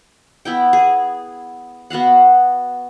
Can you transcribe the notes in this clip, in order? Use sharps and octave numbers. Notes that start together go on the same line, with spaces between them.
B3 E4 G5
G#4
B3 F#4 F5 F#5